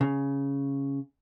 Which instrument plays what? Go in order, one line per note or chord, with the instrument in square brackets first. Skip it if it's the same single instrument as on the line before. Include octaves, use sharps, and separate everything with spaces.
[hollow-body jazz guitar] C#3